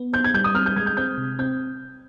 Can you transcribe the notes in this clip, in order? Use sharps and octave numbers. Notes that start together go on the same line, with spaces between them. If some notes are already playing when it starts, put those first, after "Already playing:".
Already playing: B3
C5 G6
G#6
G3 G6
D#6
C4 F6
G6
G#3 G#6
G6
C4 G6
C3
C4 G6